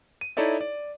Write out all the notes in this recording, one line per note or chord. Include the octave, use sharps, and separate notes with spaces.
D#7
D#4 E4 A4 C#5 D5 E5
D5